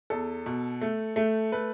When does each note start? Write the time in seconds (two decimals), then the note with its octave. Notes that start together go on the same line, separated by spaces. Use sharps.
0.10 E2 A4
0.46 B2
0.82 A3
1.16 A3
1.52 A3 B4